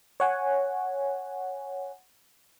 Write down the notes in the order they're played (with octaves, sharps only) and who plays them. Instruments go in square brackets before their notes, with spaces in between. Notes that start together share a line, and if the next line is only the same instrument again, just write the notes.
[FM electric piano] C#5 F#5 G#5